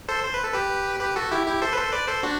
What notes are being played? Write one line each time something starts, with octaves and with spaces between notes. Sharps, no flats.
A4 C5
C5
B4
A4
G4 B4
G4 B4
F#4 A4
E4 G4
E4 G4
A4 C5
B4
A4 C5
B4 D5
A4 C5
D4 F#4